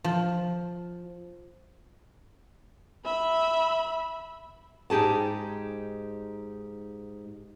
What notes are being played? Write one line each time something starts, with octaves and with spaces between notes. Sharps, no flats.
F3
E5 B5
G#2 D#4 G4 G#4 A5